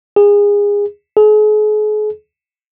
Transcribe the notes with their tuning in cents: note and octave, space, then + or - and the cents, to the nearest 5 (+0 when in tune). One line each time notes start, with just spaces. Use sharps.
G#4 -25
G#4 +40